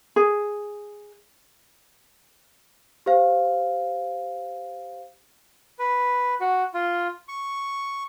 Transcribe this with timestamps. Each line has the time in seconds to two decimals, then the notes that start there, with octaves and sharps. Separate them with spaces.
0.16 G#4
3.06 G4 C5 F5
5.79 B4
6.40 F#4
6.74 F4
7.28 C#6